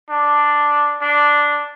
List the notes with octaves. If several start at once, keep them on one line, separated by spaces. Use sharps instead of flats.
D4
D4